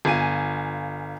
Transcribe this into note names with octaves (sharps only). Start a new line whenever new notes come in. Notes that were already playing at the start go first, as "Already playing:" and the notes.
G1 F4 G#5 D#7